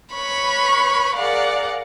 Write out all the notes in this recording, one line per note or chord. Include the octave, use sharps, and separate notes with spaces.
B4 C#5 B5 C#6
G#4 A#4 D5 F5 F#5